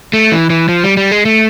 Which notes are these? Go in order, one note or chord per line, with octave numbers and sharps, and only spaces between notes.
A3
E3
E3
F3
G3
G3
G#3
A3